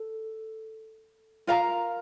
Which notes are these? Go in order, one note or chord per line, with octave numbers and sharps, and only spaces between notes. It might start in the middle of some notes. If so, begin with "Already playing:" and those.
Already playing: A4
F4 A#4 F5 A#5